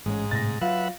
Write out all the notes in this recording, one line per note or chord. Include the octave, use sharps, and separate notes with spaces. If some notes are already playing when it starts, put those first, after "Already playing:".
A1 G#2 G#3 C#4
A2 C3 A6 A#6
F#3 F4 B4 E5 F#5